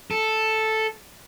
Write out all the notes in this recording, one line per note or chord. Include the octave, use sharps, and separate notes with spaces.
A4